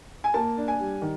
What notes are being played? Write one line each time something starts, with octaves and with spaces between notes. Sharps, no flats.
G#5
A#3 A5
D4
G#5
G3
D#3